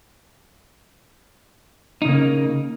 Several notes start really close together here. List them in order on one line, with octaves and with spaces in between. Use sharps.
D#4 C#3 A#3